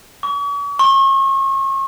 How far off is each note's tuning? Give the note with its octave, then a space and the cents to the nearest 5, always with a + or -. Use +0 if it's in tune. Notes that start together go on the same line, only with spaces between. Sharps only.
C#6 +45
C#6 -40